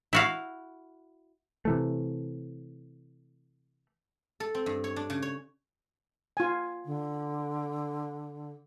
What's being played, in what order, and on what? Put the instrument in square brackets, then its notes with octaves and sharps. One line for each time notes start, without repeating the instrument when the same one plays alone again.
[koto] E4 F#4 F5
[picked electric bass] C3 E3 A3
[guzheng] A4
C4
G2
C#5
D4
C#3
C#5
[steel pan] F4 G#5
[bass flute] D3